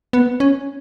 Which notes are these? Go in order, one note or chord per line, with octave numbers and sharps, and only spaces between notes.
B3
C#4